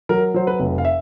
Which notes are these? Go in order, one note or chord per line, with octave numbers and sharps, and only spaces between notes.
F#3 A#4
F#3 C5
B4
F1
F5
E5